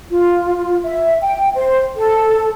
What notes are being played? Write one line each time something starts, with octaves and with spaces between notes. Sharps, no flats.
F4
E5
G5
C5
A4